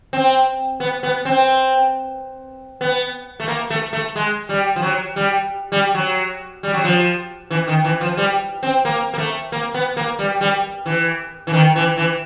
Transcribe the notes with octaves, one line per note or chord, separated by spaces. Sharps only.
C4
B3
B3
C4
B3
A3
A#3
A3
A3
G#3
G3
F3
F#3
G3
G3
F#3
G3
F#3
F3
E3
D#3
E3
F3
G3
C4
A#3
A#3
A3
A#3
B3
A#3
G3
G3
E3
E3
D#3
E3
E3